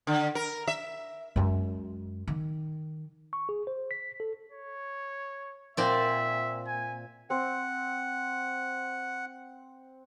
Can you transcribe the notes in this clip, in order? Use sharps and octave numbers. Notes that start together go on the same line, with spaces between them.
D3
A#4
E5
F#2 G#3
D#3
C#6
G#4
C5
B6
A4
C#5
A#2 C4 D5 E5
G#5
C4 C5 F#5